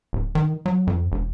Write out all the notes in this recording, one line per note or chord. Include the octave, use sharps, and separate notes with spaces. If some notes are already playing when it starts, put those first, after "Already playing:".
D1
D#3
F#3
F2
E1